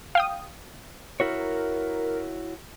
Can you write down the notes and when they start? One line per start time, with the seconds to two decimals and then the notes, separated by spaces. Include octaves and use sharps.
0.15 F5 G5 D#6
1.20 E4 F#4 A#4 C#5